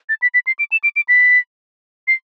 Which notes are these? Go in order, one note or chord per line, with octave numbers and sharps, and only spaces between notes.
A6
B6
B6
C7
D7
E7
D7
D7
B6
C7